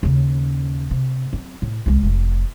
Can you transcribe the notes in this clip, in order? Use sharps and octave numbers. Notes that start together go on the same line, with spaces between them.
D#2 C#3
C3
F#3 C4
A2
C2 G#3
F1